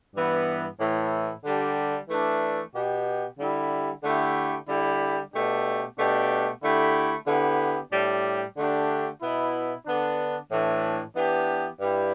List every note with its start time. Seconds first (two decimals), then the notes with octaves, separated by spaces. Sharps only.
0.16 G2 E3 B3
0.80 A2 E3 A3 E4
1.45 D3 G3 D4 G4
2.10 E3 A3 D4
2.75 B2 B3 G4
3.39 D3 G3 E4 G4
4.04 D3 A3 E4 G4
4.68 D3 G3 E4 G4
5.33 B2 A3 D4 G4
5.98 B2 A3 D4 G4
6.63 D3 A3 E4 G4
7.28 D3 B3 E4 G4
7.92 A2 G3 D4 G4
8.57 D3 A3 D4 G4
9.22 B2 B3 E4
9.86 D3 B3 D4
10.52 A2 E3 A3 D4
11.16 E3 B3 D4 G4
11.81 G2 G3 E4 G4